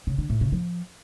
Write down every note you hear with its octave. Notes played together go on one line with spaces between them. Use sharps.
C#3
D3
A2
C#3
F3